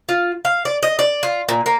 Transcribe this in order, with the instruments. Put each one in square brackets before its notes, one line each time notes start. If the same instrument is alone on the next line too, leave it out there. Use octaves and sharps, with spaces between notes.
[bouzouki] F4
F5
D5
D#5
D5
F4
A#2
A#3